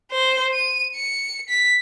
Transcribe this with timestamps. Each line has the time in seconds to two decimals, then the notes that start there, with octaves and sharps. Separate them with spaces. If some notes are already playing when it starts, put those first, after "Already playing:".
0.11 C5
0.54 D#7
0.95 C#7
1.49 B6